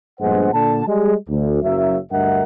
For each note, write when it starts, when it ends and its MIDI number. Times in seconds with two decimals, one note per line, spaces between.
0.20 0.50 34
0.20 0.50 43
0.20 0.50 56
0.20 0.50 59
0.20 0.50 72
0.20 0.50 78
0.53 0.84 46
0.53 0.84 50
0.53 0.84 81
0.86 1.14 55
0.86 1.14 56
1.29 1.60 38
1.62 1.98 30
1.62 1.98 42
1.62 1.98 54
1.62 1.98 58
1.62 1.98 76
2.12 2.43 38
2.12 2.43 43
2.12 2.43 70
2.12 2.43 75
2.12 2.43 76
2.12 2.43 78